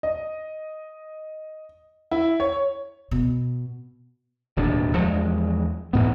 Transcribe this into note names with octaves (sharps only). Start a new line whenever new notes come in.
D#5
E4
C#5
B2
D1 D#2 B2 D4
E2 F3 G#3
A1 G#2 B3